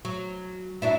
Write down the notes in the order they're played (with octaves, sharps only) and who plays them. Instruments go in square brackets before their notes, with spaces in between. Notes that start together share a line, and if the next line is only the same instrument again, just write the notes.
[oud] F#3
F#3 D4 E4